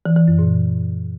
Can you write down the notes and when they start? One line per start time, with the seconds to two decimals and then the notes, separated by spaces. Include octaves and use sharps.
0.06 E3
0.17 E3
0.28 F#2
0.39 A#2